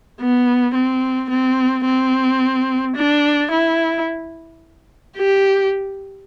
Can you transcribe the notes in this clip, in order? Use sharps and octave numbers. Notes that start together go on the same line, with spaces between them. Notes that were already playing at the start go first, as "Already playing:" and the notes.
B3
C4
C4
C4
D4
E4
G4